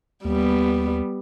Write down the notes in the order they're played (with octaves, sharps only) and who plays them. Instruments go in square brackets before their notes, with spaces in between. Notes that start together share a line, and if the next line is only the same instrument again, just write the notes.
[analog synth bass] D#2 [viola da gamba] G3 B3